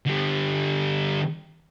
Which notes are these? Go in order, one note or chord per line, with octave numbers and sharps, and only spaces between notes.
D3 G3